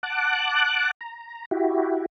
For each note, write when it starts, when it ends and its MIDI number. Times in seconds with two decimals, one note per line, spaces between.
0.03 0.91 78
0.03 0.91 81
0.03 0.91 86
0.03 0.91 90
1.01 1.45 82
1.51 2.06 64
1.51 2.06 66
1.51 2.06 67